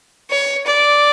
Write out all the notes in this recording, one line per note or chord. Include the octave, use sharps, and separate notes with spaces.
C#5
D5